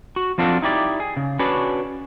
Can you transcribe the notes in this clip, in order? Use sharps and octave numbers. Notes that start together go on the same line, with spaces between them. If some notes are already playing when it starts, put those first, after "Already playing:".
F#4
F3 C4 D4 F4 F#4 A4
D#4 E4 G4 D5
G#4
C#3
C#4 D4 F#4 G#4 B4 C#5